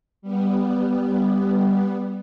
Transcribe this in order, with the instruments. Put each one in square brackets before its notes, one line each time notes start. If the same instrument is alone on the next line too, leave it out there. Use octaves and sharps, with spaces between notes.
[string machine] G3 B3